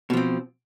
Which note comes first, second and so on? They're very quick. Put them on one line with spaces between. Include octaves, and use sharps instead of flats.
B2 F3 C4